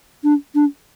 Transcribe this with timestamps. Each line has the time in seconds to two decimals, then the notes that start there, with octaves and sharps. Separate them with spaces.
0.24 D4
0.55 D4